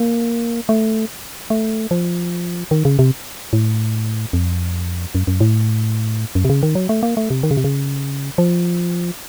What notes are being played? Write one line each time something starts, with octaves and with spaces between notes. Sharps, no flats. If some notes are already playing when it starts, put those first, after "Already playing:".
Already playing: A#3
A3
A3
F3
D#3
C#3
C3
A2
F2
F#2
F#2
A2
F#2
C3
C#3
D#3
F#3
A3
A#3
A3
C3
D#3
C#3
C3
C#3
F3